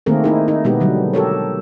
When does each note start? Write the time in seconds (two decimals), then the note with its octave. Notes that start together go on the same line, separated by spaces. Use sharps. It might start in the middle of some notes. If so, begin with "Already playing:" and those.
0.06 D#3 A3 A#3 C4 G#4 A#4
0.24 D#4 E4 G#4
0.48 D#4
0.64 B2 G#3 B3 D#4 G4
0.81 D3 F#3 G3
1.13 G4 A4 A#4 C#5